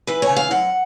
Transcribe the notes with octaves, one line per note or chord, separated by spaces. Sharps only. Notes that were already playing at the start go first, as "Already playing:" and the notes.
E3 B4
C#5
C#3
F5
F#2 F#5